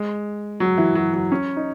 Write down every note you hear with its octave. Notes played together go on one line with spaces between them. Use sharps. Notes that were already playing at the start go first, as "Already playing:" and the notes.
Already playing: G#3
F#3
E3
F#3
F#3
C#4
D#4